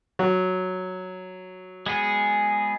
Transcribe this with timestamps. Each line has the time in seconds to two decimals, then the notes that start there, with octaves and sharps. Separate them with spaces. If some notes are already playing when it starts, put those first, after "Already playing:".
0.19 F#3
1.86 G#3 B3 G#4